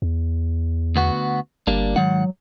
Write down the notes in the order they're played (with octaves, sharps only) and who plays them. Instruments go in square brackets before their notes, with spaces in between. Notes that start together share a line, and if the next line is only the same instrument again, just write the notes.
[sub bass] E2
[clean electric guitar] D2 B3 F#4
[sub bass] G1 [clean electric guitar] G3 A#3 D4
[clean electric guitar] G#2 D#3 F#5 [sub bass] F#3